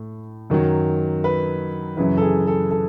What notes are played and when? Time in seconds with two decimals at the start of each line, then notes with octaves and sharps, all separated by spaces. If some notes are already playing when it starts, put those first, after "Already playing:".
Already playing: A2
0.50 F#2 D#3 F#3
1.24 B4
1.97 F#2 C#3 E3 B4
2.17 A4
2.22 G#4
2.47 A4
2.71 A4